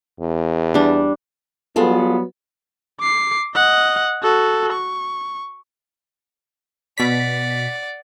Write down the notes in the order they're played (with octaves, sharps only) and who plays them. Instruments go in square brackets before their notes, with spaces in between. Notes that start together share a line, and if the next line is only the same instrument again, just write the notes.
[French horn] E2
[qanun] G3 D4
[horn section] F#3 G3 B3 [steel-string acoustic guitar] F4 G#4 A4
[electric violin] D6 C7
D#5 F#5
F#4 A4
C#6
[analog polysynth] B2 B6 [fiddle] D5 F#5